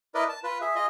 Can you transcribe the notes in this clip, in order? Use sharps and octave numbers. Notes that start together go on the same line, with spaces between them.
E4 A#4 B4 D5 D#5
A5
F4 B4
G#4 E5
F4 G#4 D#5